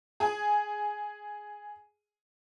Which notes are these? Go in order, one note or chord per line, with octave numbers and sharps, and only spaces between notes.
G#4 G#5